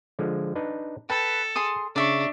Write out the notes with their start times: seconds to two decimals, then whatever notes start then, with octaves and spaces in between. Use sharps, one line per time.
0.19 D3 F3 G#3
0.55 D4 D#4 B4
1.10 A4 B4 G5 A5
1.56 G#4 C6 D#6
1.96 C#3 D4 D5 E5 C#6